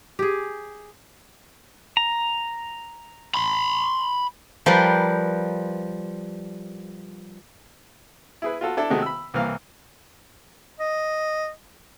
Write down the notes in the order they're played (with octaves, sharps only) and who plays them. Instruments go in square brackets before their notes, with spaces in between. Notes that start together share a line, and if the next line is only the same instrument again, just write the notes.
[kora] G4 G#4
[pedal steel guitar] A#5
[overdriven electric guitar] B5 C6
[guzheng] F3 G3 A#4 B4
[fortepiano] E4 G#4 B4
F4 F#4 A4
D4 E4 A4 A5
C3 D#3 G#3 A3 F#4
B5 E6
C2 E3 A#3 F5
[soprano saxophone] D#5